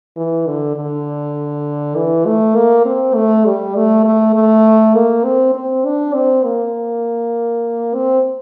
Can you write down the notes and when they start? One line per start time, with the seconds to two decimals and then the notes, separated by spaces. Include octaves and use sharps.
0.17 E3
0.47 D3
0.77 D3
1.96 E3
2.26 A3
2.56 A#3
2.85 C4
3.15 A3
3.46 G3
3.76 A3
4.05 A3
4.35 A3
4.95 A#3
5.25 C4
5.55 C4
5.85 D4
6.14 C4
6.45 A#3
7.94 C4